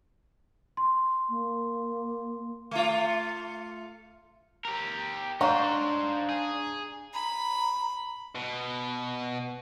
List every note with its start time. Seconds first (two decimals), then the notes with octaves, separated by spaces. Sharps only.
0.77 C6
1.29 A#3
2.71 A3 F4
4.65 G4 A#4
5.41 D4 D#4 C5 F5 A#5 C#6
6.29 G#4
7.14 A#5 B5
8.35 B2